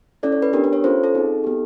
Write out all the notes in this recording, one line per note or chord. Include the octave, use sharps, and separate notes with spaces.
C#4 E4 A4 D5
C#5
B4
B3 D4 G4 A#4
B4
C#5
C#4 F4 A4 C5
A4
C4 D#4 G#4
B3 D#4 G4